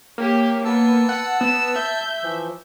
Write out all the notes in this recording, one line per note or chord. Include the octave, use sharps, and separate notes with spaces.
A#3 G4 C#5
B3 A5 E6
F#5
B3 E7
E5 G6
E3 F3